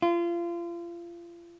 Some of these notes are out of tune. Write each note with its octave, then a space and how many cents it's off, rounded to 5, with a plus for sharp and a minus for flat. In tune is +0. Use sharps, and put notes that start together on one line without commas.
F4 -30